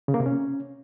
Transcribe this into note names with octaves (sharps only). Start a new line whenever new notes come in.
C#3
A#3
C3
C#4